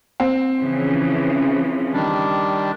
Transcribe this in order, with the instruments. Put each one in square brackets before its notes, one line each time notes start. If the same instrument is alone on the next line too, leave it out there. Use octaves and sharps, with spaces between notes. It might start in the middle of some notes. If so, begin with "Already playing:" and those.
[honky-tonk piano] C4
[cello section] C#3 E3 F3
[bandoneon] D#3 G3 D4